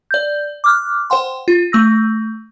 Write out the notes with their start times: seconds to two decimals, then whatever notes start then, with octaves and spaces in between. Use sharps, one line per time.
0.11 D5 G6
0.64 D6 F6 F#6
1.10 C5 F#5 G5 C6
1.48 F4
1.72 A3 E6 A#6